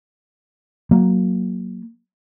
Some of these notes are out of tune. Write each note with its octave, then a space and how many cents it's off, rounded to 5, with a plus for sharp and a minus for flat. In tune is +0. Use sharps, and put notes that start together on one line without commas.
F#3 +0 A#3 +0